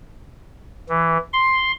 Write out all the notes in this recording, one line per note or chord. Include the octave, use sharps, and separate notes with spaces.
E3
C6